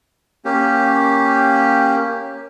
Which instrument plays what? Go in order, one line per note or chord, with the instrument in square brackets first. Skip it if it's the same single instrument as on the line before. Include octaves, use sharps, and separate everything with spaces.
[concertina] A#3 C#4 G4